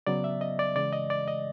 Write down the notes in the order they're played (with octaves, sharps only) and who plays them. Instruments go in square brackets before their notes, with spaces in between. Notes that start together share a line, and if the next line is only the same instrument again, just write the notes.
[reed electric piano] C#3 F#3 B3 D5
E5
D#5
D5
C#3 E3 G#3 D5
D#5
D5
D#5